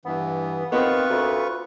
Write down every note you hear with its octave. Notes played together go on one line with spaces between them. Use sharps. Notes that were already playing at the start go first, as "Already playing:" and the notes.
G2 E3 B3
D#3 B3 C4 F4 B4 C#6
D2